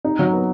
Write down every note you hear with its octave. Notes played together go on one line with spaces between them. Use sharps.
D#4
F#3
B3